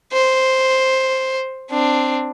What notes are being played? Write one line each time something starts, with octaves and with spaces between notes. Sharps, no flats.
C5
C4 D4